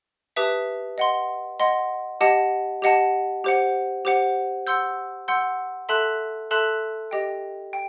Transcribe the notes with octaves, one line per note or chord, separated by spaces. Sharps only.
G4 B4 E5 A5 D#6
D#5 F#5 C6
D#5 F#5 C6
G4 D#5 F#5 A5
G4 D#5 F#5 A5
G4 C5 F#5
G4 C5 F#5
F#5 C6 E6 G6
F#5 C6 E6 G6
A4 E5 A5 C6 F#6
A4 E5 A5 C6 F#6
G4 D#5 G5
G5